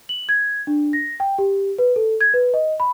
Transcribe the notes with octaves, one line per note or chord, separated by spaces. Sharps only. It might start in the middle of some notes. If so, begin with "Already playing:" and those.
F#7
G#6
D4
A#6
G5
G4
B4
A4
G#6
B4
D#5
B5